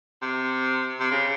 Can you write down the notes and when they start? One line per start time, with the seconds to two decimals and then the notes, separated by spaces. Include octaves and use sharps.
0.22 C3
1.00 C3
1.11 C#3